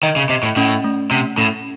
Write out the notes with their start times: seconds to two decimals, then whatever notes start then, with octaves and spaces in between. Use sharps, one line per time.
0.03 D#3 D#5
0.16 C#3
0.29 C3 D#5
0.43 A2
0.56 A2 C#4
0.84 A3
1.11 C3 C#4
1.38 A2 C#4